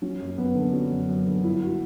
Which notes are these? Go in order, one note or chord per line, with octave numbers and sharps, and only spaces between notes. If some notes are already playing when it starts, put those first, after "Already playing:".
F#3 C#4
F#2
F#2 B3
D3
F#3 C#4
F#2
F#2
D3
G2 E4
F#4